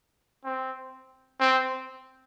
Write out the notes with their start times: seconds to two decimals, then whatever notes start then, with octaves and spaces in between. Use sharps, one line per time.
0.45 C4
1.40 C4